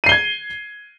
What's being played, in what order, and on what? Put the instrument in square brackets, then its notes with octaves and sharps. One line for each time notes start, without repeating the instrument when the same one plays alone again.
[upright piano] D#7
C7
G7
G#6